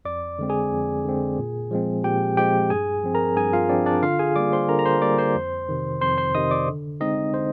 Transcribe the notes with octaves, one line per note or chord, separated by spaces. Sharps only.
F2 D5 D6
D3 G#3 C4
G#4 G#5
F2
D3 G#3 C4
A#2
F3 G#3 C4
A#2 G4 G5
F3 G#3 C4 G4 G5
G2 G#4 G#5
F3 C4
A#4 A#5
G2 G#4 G#5
F4 F5
F3 C4 D4 D5
D4 D5
D3 F4 F5
G#4 G#5
G3 A#3 D5 D6
C5 C6
D3 A#4 A#5
A#5
C5 C6
G3 A#3 D5 D6
C5 C6
F2
C3 D#3
F2 C5 C6
C5 C6
C3 D#3 D#5 D#6
D5 D6
D3
G#3 C4 D#4 D#5
D3 C5